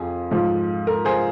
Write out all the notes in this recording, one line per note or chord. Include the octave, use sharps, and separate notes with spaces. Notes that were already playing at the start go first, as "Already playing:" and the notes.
Already playing: F2 F3 G#4
G#2 F3
A#4
G#4 C5